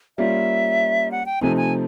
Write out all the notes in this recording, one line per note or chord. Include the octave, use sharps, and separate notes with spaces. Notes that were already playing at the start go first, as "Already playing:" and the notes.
G3 A#3 C#4 F4 E5
F#5
G5
C3 F3 A3 C4 D#4 G#5
G#5